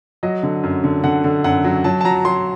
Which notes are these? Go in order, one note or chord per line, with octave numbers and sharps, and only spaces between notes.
F#3 D#5
D3
F#2
D3
D3 F#5
D3
F#2 F#5
F#3
F#3 A5
A5
F#3 A#5
F#3 C6